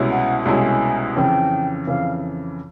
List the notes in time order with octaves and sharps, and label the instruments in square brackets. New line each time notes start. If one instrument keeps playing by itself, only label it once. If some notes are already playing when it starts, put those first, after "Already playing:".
Already playing: [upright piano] C2 B2 G#3 C#4 E4
[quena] F#5
[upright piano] C2 B2 G#3 C#4 E4 [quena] G#5 A#5
[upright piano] F2 C#3 E3 [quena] G5
[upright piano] F2 C#3 E3 [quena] F5